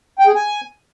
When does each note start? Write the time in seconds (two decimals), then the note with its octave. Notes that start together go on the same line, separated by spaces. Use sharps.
0.19 G5
0.27 G#4
0.35 G#5